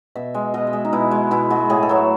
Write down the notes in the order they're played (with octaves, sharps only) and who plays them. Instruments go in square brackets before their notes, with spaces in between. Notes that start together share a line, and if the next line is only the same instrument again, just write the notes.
[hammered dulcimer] B2 E5
G#3
B2 D#5
E5
G#3
D#4
B2 E4
G#3
B2 E4
G#3 F#4
A2 G#4
A4
F#3 A3